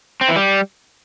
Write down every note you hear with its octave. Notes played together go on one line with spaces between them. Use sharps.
C4
E3
G3